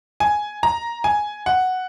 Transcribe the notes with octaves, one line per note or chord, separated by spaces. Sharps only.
G#5
A#5
G#5
F#5